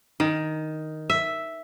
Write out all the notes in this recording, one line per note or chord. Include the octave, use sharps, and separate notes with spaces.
D#3
E5